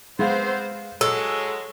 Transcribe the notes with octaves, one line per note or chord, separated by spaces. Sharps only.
G#3 B3 C4 C5 F5
F#3 G#3 A4 E6